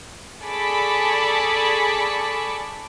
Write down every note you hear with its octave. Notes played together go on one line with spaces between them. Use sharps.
G#4 A4 D5 A5 B5 C#6